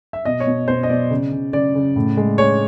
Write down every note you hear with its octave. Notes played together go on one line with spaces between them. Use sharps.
E5
B2 D#5
C#5
B2
B2 C5
D#5
B2 D5
C#3
C#3
C#3 D5
C#3
A2
G#3
G#3 C#5